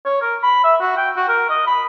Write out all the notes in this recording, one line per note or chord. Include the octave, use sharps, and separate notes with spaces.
C#5
A#4
B5
E5
F#4
G5
F#4
A#4
D#5
B5